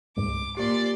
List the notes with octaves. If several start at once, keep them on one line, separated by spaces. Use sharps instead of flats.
C#2 G#2 D6
A#2 G4 D5 C6